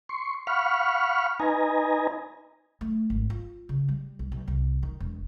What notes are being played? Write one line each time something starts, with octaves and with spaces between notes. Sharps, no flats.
C6 C#6
F5 F#5 B5 C#6 F6
D#4 B4 D#5 G#5 A#5
A3
G#1
F4
C#3
G3
B1
B1
C2
D#3
E1